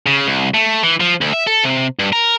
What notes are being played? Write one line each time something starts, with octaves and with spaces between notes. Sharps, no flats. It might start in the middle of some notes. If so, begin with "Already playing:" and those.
C#3
C2
A3
E3
F3
D2
E5
A4
C3
G2
A#4